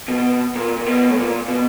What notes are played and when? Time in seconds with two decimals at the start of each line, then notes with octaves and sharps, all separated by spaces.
0.08 B2
0.56 A#2
0.77 A#2
0.86 B2
1.10 A2
1.17 A#2
1.48 B2